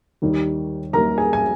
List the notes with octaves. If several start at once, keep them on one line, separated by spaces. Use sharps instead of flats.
D#2 D#3 G3 A#3
D#2 D#3 G3 A#3 A#4 A#5
G#4 G#5
G#5